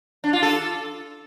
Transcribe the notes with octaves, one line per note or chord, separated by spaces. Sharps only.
D4
F4
A4